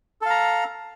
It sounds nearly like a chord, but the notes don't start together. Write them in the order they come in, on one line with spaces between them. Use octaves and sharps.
A4 F5 A#5